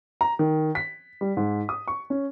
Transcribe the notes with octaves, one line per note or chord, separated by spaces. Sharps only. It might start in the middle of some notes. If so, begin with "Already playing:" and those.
A#5
D#3
B6
G3
G#2
D#6
C#6
C#4